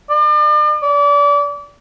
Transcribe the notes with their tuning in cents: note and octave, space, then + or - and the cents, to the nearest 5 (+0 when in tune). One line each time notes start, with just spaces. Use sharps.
D5 +40
D5 -30